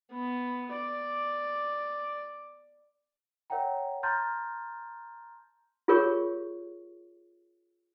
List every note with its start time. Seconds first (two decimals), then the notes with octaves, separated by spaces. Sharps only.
0.12 B3
0.73 D5
3.50 A#4 C#5 E5 F#5 G5 A#5
4.03 A5 A#5 C6 F6 G6 A6
5.88 F4 G4 G#4 A#4 C#5 C#6